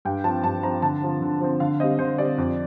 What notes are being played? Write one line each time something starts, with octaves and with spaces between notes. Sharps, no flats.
G2 G5
F3 C4 A5
G2 A5
F3 C4 A#5
D3 A5
F3 C4
D3
F3 C4
D3 F5
G3 C4 D#5
D3 C5
G3 C4 D5
F2